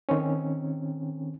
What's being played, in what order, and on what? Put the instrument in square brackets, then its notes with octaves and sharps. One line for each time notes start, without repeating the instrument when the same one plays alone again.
[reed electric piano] D#3 C4 C#4